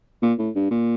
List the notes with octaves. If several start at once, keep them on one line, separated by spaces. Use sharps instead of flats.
A#2
A2
G2
A#2